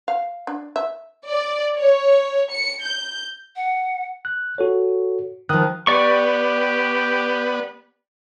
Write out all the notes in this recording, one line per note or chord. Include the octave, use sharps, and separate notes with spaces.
F5
D4
E5
D5
C#5
C#7
G6
F#5
F#6
F#4 A4 C#5
D#3 F3 D#6 F#6
B3 G4 D5 C#6